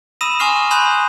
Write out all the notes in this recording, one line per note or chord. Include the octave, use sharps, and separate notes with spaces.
B5 D#6 E6 A#6 D#7 E7
G#5 C6 C#6 F6 C7 F7
G#5 B5 C6 D#6 F#6 G6